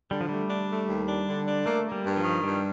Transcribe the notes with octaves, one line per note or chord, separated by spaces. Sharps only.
D3 G3
F3
G3 A3
D4
A3
D#2
D4
D3
D4
A3 A#3
A#3
G3
G2
F3
D#3
G2 G3